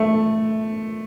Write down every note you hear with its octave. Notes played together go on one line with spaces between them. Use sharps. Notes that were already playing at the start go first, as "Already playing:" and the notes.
Already playing: A3